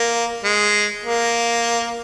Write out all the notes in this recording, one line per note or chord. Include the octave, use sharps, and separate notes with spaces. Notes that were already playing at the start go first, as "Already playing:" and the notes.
Already playing: A#3
G#3
A#3